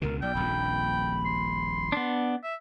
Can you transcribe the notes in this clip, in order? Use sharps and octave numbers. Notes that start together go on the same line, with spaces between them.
C#2 B2 D3 A#4
B1 D5 G5
D#1 A#1 F2 B5
C6
B3 D4
E5